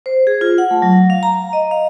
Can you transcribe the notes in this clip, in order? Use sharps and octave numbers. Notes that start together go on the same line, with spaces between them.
C5
G#4
F4
F#5
A3
F#3
F5
A#5
D#5
F5